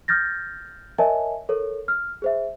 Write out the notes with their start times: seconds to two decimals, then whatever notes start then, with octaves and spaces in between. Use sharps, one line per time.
0.08 D#6 F6 G6 A6 A#6
0.98 A#4 C#5 D#5 E5 G#5 A5
1.49 A4 A#4 C#5
1.88 F6
2.22 G#4 C5 E5